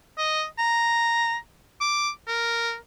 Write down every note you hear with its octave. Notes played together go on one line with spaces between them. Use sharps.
D#5
A#5
D6
A#4